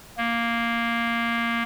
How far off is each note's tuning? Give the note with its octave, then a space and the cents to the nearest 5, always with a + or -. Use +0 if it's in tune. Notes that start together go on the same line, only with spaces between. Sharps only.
A#3 +0